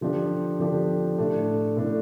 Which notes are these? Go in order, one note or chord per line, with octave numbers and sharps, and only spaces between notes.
D3 F3 D4 G4
D3 F3 D4 G4
A2 A3 D4
A2 A3 D4